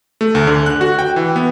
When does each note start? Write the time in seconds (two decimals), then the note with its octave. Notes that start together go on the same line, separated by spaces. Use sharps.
0.21 A3
0.35 D2
0.47 D3
0.66 F#6
0.81 F#4
0.99 G5
1.16 E3
1.36 B3